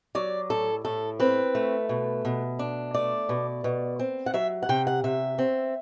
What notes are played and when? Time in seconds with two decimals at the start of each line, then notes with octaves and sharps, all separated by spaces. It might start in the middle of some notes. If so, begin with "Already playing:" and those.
0.15 F#3 D5
0.50 A2 A4
0.85 A2 A4
1.20 C4 B4
1.55 A3
1.89 B2
2.25 B2
2.59 D4
2.94 A3 D5
3.29 B2
3.64 B2
3.99 C4
4.26 F#5
4.34 F#3 E5
4.63 F#5
4.69 C3 G5
4.87 F#5
5.04 C3 E5
5.39 C4